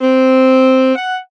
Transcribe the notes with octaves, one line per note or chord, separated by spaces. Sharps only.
C4
F#5